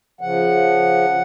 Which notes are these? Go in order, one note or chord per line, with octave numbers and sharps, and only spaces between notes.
C#3 F3 F#5